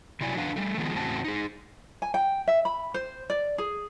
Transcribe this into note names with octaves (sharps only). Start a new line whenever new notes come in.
C3 F#3 E4 D5 G#5
D3 F3 D4 B4 F5 F#5
G3 A3
D#3 F3 G#3 B3
E2 A2 C#3 C4 F#4 A5
D#4 G#4
G#5
G5
E5
B5
C5
D5
G#4